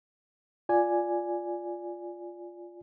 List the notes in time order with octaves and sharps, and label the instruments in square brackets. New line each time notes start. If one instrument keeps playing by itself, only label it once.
[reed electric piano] F4 D5 G#5